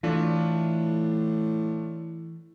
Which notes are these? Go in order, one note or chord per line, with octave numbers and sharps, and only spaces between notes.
A2 E3 A3 D4 F4